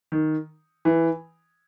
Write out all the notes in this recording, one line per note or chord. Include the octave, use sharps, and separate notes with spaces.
D#3
E3